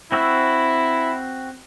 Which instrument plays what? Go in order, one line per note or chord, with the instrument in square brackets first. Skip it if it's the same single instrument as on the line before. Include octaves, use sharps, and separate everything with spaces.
[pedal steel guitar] C4 F#4 E6 [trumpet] E4